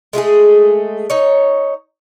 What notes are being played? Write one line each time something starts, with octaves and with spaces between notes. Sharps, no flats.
G#3 A3 F4 G#4
D#4 C#5